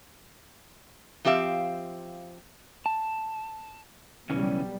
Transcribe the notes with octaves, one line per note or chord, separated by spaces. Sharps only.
F3 C4 G4 E5 F5
A5
B1 C#3 E3 G3 C#4